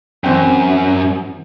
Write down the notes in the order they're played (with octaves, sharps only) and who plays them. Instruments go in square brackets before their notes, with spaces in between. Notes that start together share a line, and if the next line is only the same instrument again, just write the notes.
[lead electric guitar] F#2 [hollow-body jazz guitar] E3 C4 G5